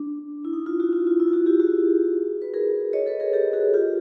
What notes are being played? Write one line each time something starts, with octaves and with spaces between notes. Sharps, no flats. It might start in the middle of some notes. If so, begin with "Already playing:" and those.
Already playing: D4
E4
D#4
F4
E4 F#4
F4
F4
E4
F4
E4 F#4
F4 G4
F#4 G#4
B4
G#4 A#4
C#5 D#5
A4 B4
G#4 A#4
G4 A4
F#4 G#4
F4 G4